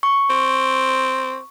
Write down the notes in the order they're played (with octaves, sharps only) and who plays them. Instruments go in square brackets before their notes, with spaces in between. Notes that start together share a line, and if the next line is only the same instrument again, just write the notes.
[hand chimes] C#6
[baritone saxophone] C4